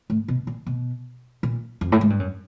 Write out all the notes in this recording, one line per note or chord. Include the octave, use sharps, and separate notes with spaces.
A2
B2
A#2
B2
A#2
F2
A2
G#2
G2
F#2